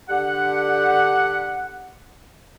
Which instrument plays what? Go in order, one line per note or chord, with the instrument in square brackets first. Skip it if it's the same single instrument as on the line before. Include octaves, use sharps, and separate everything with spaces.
[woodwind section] D3 G4 F#5